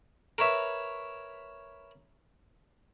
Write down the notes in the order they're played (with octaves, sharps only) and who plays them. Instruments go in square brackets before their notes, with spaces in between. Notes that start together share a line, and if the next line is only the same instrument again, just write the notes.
[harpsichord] A#4 B4 C#5 E5